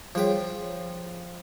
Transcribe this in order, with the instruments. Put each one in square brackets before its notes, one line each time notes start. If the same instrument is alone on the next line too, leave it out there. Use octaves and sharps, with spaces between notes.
[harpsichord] F3 G5 [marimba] G3 G#4 C#5